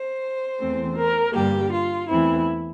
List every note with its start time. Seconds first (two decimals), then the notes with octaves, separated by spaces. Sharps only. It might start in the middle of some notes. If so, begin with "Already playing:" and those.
Already playing: C5
0.59 E2 E3 A3 C4
0.97 A#4
1.34 G2 D3 G3 A#3 G4
1.72 F4
2.09 E2 E3 A3 C4 E4